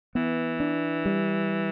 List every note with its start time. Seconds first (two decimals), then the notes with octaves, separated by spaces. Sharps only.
0.15 E3 B3
0.60 D4
1.05 G3